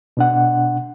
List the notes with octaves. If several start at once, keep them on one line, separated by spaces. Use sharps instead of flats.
B2 D4 F#5